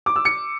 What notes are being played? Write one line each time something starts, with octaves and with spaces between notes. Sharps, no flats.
D6
E6
C#7